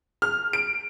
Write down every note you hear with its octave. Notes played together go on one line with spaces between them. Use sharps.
F6
D7